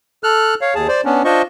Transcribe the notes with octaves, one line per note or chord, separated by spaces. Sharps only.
A4 F6 F#6
C#5 F5
D#2 G#4 A5
C5 D5
B3 C#4 D4
D4 F4 C5 D#5 C#6